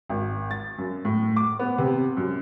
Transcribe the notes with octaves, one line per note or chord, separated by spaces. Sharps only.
G#1
A6
F#2
A2
D6
B3
C3
F#2